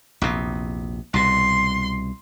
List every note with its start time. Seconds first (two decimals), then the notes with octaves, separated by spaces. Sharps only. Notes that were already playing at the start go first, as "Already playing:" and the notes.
0.22 A#1 E2 C3
1.14 C2 B2 C6